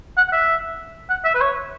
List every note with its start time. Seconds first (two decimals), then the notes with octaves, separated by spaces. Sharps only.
0.18 F#5
0.29 F#5
0.33 E5
1.10 F#5
1.25 E5
1.35 B4
1.41 C#5